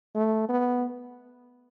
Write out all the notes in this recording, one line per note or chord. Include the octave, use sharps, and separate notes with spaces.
A3
B3